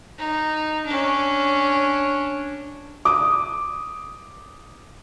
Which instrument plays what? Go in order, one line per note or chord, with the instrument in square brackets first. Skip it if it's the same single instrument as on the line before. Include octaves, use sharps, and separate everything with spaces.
[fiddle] D#4
C#4 D4
[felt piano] D6 D#6